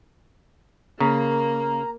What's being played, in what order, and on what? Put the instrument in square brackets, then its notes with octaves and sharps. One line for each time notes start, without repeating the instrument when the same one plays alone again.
[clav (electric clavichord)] C#3 [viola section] A#3 [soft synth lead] A#5